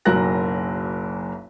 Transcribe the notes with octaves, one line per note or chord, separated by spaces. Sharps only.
F#1 B1 F#3 A#4 F#6 A#6